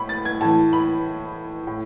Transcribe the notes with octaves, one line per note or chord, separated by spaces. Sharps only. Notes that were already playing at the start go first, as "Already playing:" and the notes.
Already playing: A2 B5
A6
G#6
A2 E3 A5
B5
A2